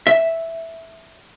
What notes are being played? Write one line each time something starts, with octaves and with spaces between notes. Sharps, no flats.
E5